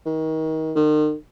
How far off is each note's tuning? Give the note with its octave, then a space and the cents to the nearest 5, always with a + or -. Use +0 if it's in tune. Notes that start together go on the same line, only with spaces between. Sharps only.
D#3 +30
D#3 -40